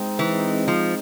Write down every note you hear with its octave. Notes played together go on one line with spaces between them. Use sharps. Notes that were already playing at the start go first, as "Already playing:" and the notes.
Already playing: G#3 C4 D#4
E3
F3